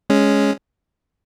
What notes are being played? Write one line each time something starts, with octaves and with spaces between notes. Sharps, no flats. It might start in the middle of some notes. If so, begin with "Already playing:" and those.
G#3 C#4